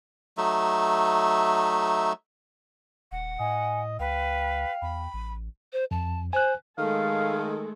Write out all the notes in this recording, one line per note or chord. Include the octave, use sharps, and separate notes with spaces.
F#3 A3 D#4 E5
D#1 F#5
A2 D#5 G#5
C#2 B4 F5 G5
E2 B5
A1
C5
F2 A5
C5 G#5 F#6
D#3 G#3 A3 A4 F5